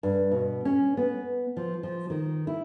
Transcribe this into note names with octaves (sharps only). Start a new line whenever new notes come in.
G2
B2
C#4
B3
F3
F3
D#3
E4